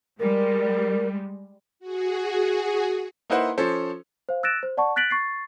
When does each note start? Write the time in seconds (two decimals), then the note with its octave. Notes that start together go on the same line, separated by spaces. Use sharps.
0.19 G3 G#3 A#4
1.80 F#4 G#4
3.30 A#3 D#4 E4 B4 C5 F#5
3.58 F3 C#4 A4 C5
4.29 C5 F5
4.43 E6 F#6 A6 A#6 D7 E7
4.63 C5
4.77 D5 F#5 A5 C#6
4.96 F#6 A6 B6 D7 F#7
5.11 C#6 A6 C7